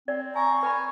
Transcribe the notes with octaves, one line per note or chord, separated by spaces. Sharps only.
C4 D5
G#5 A#5 C#6
B4 G#5 B5